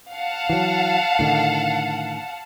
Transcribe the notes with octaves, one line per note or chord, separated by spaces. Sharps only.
F5 F#5 A5
E3 F#3
A2 D3 D#3